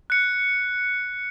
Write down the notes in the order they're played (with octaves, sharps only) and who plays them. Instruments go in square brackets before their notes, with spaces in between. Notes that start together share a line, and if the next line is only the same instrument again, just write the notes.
[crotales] F#6 C#7